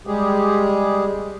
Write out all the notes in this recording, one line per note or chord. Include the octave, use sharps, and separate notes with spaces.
G3 G#3 G4 G#4